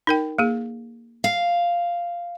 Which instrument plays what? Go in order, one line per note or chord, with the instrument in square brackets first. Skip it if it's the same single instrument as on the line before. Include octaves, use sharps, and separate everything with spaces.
[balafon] D#4 A#4 G5
A#3 G#4
[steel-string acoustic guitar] F5